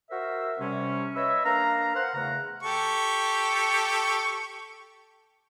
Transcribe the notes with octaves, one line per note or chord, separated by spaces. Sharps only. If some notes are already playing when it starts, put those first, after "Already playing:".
F#4 A#4 C5 E5
C3 G3 C#4
B4 C#5 D#5 E5
A#3 D4 B4 F5 A#5
C5 F5 F#5
E2 C#3 A3 F5 F#5 A#5
G4 A4 C#6